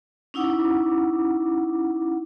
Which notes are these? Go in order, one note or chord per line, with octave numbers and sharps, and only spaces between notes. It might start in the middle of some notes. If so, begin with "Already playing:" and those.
C#4 D#4 E4 F#5 D6